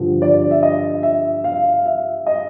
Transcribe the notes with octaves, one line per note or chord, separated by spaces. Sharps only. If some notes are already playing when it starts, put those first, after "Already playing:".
Already playing: G2 D3 F3
D5
E5
D#5
E5
F5
E5
D#5